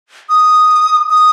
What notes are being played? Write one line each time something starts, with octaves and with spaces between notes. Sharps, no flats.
D#6
D#6